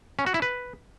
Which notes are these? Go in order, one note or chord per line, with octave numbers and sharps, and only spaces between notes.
C#4
F#4
E4
B4